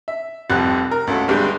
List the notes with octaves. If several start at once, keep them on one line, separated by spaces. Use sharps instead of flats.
E5
F1 C2 F2 G4 F#6
A#4
C#2 A3 F#4 A4
G1 G2 G3 G#3 G6